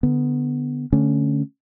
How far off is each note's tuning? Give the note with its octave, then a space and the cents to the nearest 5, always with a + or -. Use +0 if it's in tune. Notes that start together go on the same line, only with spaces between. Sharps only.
D3 +0 B3 +0
D3 +0 A3 +0 C#4 +0